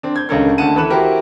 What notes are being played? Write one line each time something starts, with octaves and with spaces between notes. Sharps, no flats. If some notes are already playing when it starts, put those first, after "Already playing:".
C4 D4
G6 G#6
C#2 D3 C#4 A4 A#4 G#6
D2 D3 A#3 F#5 A5 D#7
E3 A4 B5 F#6 E7
E4 F#4 G4 A#4 C5